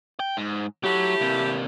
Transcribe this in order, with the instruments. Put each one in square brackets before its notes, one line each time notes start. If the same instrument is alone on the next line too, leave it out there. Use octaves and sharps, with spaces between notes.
[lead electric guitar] G5
G#2
[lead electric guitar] F#3 F#4 [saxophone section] A3 E4 G4
[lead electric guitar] C3 A#3